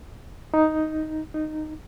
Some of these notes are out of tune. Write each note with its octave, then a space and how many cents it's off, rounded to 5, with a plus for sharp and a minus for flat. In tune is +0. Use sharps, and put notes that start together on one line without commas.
D#4 +5
D#4 -10